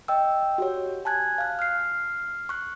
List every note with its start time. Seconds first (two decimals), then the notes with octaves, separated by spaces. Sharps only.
0.08 D#5 G5 E6
0.58 F#4 G4 C#5
1.05 G#5 A5 F#6 G#6
1.38 F5 F#6
1.59 F6 C7
2.49 C#6 F#6